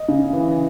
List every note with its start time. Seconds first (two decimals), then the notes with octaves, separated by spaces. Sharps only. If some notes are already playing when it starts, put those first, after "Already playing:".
Already playing: D#5
0.09 C#3
0.33 E3